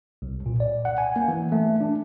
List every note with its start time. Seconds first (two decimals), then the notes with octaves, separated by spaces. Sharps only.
0.22 C2
0.46 A#2
0.60 D5
0.85 F#5
0.98 G#5
1.16 A#3
1.28 E3
1.52 A3
1.81 D4